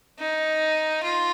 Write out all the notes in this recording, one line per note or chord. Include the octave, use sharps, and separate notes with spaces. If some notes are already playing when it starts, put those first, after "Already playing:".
D#4
F4